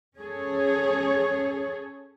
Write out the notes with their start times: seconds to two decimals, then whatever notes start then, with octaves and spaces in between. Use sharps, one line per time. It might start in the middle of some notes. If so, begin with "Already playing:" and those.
0.17 C#4 G#4 A4 C#5